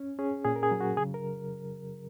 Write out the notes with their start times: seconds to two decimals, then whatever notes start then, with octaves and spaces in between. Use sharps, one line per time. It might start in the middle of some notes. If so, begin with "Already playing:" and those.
Already playing: C#4
0.18 C#4 G#4
0.45 A#2 G#4
0.56 A#4
0.63 G#4
0.71 F#3
0.80 F#4
0.97 C#3 G#4
1.14 A#4